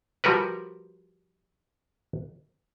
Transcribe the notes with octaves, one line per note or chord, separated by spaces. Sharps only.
F3 G3 F#4 A#4 B4